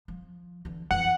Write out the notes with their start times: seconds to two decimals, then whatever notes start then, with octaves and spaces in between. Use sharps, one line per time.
0.08 F3
0.65 D3 E3
0.91 F2 E3 F#5